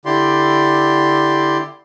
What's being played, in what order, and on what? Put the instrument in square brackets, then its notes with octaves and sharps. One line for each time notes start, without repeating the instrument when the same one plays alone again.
[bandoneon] D3 E4 G4 D5 C6